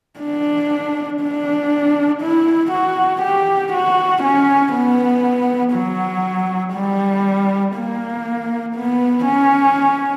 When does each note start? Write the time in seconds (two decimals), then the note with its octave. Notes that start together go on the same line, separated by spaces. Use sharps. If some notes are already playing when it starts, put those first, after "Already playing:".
0.20 D4
1.22 D4
2.22 E4
2.71 F#4
3.22 G4
3.73 F#4
4.23 C#4
4.73 B3
5.73 F#3
6.74 G3
7.75 A#3
8.76 B3
9.26 C#4